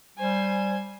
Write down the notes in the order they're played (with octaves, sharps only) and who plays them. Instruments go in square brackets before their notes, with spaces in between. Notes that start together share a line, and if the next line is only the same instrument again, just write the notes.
[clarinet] G3 [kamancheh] C5 G#5